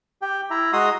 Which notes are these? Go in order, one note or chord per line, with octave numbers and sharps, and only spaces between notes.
G4 G5
E4 E5 A#5
G#3 F#4 A#5 C6 D#6